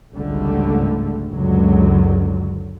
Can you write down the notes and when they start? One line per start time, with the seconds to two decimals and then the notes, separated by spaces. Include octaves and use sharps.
0.15 G#1 C#2 D3 G3 A3
1.32 F#1 C#2 F#2 D3 F#3